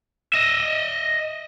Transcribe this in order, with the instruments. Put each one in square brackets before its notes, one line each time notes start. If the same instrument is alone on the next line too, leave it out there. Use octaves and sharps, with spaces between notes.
[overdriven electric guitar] D#5 E5